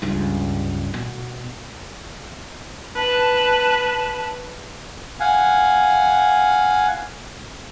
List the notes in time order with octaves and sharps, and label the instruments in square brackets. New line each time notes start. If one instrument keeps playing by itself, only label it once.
[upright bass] C#2 G2
B2
[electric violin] B4 [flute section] A5
[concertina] F5 F#5 G#5